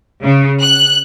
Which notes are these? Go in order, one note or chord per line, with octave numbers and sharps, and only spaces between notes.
C#3
F#6